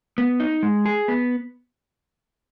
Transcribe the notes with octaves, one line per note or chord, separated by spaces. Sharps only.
B3
D#4
G#3
G#4
B3